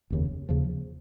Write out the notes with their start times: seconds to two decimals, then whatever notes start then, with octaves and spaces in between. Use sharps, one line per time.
0.10 F1 D#2 C#3
0.49 D#2 C#3 F3